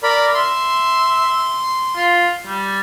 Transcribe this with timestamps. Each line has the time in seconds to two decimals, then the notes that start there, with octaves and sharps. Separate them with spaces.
0.03 A#4 D5 B5
0.34 E5 C6
1.96 F4
2.47 G3